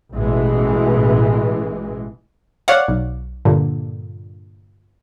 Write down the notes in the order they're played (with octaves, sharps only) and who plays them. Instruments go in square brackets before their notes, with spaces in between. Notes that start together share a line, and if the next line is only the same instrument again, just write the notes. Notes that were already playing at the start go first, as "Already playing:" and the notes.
[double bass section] A1 B2 E3 G#3
[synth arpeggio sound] C#5 D5 F5 F#5
B1
G2 A#2 D3